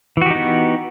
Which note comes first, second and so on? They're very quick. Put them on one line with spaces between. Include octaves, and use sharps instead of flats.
E3 F#4 G4 D#4 B3